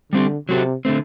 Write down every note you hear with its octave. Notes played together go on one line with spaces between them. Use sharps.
D3 G3 C4 G4
C3 F#3 C4 F#4 A4
D3 A3 C4